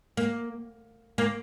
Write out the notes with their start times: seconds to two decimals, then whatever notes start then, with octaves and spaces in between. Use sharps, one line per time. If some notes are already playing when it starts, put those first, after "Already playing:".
0.17 A#3
1.18 A#3